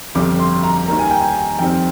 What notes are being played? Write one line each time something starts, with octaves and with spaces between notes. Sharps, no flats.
G1 F2 D3 G3 D6
C6
A#5
D#2 D#3 G3 A#3 A#5
G#5
G5
G#5
F2 D#3 G3 C4 G5